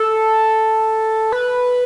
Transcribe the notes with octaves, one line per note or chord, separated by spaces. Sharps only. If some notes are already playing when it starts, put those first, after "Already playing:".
Already playing: A4
B4